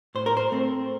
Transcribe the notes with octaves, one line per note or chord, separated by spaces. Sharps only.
A2 C5
A#4
C5
A3 C4